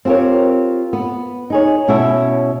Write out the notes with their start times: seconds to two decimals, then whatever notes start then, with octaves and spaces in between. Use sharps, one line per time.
0.05 C4 F4 G4 A#4 C#5
0.93 B3
1.50 D#4 G#4 C#5
1.88 B2 C#4 E4 C#5 E5 A5